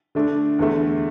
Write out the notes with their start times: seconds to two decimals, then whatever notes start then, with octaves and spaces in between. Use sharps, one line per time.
0.15 D3 A3 D4
0.59 E2 D3 A3